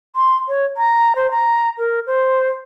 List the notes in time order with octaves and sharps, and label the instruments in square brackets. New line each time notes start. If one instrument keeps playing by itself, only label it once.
[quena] C6
C#5
A#5
C5
A#5
A#4
C5